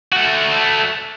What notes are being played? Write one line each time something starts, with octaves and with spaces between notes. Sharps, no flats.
A3 F#4